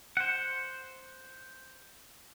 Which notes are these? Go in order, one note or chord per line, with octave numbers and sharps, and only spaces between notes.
C5 F#5